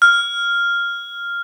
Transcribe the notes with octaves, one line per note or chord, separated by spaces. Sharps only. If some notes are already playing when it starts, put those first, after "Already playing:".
F6